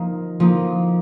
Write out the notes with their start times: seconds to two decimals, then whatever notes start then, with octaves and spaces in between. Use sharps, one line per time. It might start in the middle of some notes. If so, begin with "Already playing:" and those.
Already playing: F3 A#3 D#4
0.40 F3 A#3 D#4